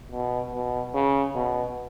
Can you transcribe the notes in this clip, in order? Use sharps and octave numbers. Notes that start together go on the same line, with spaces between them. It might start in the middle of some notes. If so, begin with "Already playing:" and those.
B2
B2
C#3
B2